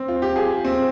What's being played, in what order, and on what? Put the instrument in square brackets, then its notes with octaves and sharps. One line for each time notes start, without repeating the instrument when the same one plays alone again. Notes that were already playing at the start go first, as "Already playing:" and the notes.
Already playing: [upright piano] C4
F4
G4
G#4
C4